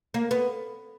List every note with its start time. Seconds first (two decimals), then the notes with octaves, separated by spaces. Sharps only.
0.14 A#3
0.31 B3